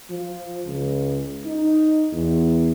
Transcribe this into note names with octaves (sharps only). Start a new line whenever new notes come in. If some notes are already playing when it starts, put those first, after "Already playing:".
F3
C#2
D#4
E2